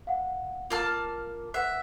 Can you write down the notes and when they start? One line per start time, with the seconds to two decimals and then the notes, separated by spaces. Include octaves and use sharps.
0.07 F5 F#5
0.70 A#3 F4 A5 F6
1.54 B4 E5 F#5 F#6